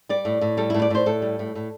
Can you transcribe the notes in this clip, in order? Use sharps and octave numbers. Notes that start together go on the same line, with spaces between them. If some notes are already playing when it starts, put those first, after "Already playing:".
G3 D5
A2
A2
G3 A4
A2 E4
D5
A2 C5
A2 A4
G3
A2
A2